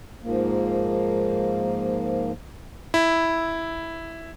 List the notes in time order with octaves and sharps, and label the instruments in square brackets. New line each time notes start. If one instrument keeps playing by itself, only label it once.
[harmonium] G#2 F3 A#3
[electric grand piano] E4